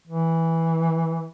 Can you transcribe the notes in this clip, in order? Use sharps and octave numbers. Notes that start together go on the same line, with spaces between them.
E3